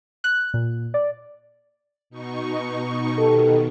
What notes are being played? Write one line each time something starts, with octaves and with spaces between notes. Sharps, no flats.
F#6
A#2
D5
B2 D#4 C#6
B2 D#3 D#4 G4 A4